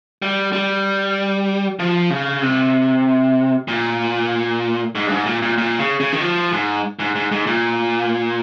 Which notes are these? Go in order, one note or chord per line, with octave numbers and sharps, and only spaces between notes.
G3
G3
F3
C#3
C3
A#2
G#2
G2
G#2
A#2
A#2
A#2
C#3
C#3
D#3
F3
G#2
G#2
G#2
G#2
A#2